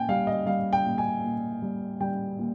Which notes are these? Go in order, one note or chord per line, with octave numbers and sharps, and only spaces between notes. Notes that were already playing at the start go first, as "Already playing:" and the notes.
Already playing: A#2 G5 G#5
G3 F5
D#5
G3 F5
G5
A#2
G#5
A#2
G3
G3 G5
A#2